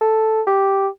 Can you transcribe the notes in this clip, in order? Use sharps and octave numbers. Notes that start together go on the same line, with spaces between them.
A4
G4